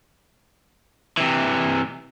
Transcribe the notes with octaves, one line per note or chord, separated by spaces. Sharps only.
C3 E3